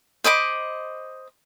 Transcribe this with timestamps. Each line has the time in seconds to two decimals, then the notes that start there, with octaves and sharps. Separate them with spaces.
0.24 C5 D#5 B5 D6